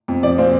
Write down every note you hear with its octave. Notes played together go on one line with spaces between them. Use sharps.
F2
F3 D5
A#2 C4